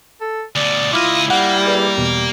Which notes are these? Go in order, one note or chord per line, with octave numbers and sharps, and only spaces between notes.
A4
D2 B2 D5
C#2 E4 F4 D#5 D6 F6
G3 A#3 F#5
G#4 B4 D5
E2 B2